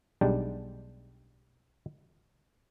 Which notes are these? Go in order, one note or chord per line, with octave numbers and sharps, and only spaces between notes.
B1 G3 G#3 D4 G5 A5